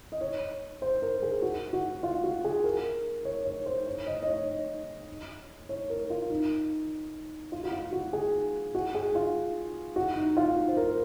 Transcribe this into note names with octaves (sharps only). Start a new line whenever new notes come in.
D#5
C#5
C5
A#4
G#4
F#4
F#4
F4
F#4
G#4
A#4
C#5
C#5
C5
C#5
D#5
D#5
C#5
C#5
A#4
F4
D#4
F4
F#4
F4
F#4
G#4
F#4
G#4
F4
F#4
D#4
F4
F#4
C5
A#4